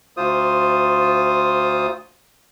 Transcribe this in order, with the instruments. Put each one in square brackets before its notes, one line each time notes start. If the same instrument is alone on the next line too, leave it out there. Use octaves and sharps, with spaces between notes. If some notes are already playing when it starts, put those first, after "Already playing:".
[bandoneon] D2 F4 C5 D#6